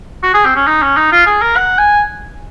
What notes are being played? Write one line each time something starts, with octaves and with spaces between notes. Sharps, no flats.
F#4
G#4
C4
C#4
D#4
C#4
D#4
F4
G#4
A#4
F#5
G#5